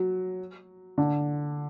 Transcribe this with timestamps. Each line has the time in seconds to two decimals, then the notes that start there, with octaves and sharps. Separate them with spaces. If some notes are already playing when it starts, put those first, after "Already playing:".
Already playing: F#3
0.98 D3